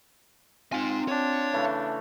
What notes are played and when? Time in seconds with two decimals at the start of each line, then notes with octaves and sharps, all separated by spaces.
0.72 C4 D#4 F4 G#5
1.08 D4 C#5
1.53 C#3 E3 A3